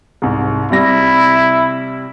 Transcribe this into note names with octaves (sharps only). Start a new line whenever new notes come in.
C2 G#2
C3 G3 E4 A#6